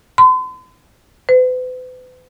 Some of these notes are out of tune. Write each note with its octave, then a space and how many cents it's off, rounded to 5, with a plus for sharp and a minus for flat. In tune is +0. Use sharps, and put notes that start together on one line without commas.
C6 -45
B4 +45